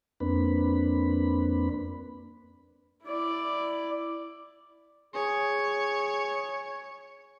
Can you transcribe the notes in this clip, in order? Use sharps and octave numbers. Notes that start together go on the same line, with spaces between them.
F2 A#3 C4 D4 B4 B5
E4 D5
G#4 C#5